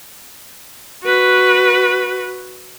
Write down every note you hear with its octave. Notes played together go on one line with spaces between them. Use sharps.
F#4 B4